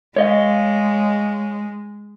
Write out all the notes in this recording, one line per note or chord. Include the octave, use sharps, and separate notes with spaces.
G#3 C#5 D#5 F5